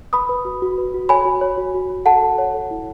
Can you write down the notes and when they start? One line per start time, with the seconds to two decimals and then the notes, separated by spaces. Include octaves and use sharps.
0.13 B4 B5 D#6
0.29 B4
0.45 F#4
0.62 F#4
0.78 B4
0.94 F#4
1.09 C#5 G#5 B5
1.25 F#4
1.41 C#5
1.58 F#4
1.74 F#4
1.90 F#4
2.05 A4 F#5 A5
2.22 A4
2.38 C#5
2.54 A4
2.71 E4